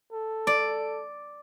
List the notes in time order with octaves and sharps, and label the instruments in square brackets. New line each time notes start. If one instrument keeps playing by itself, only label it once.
[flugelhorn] A4
[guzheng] D5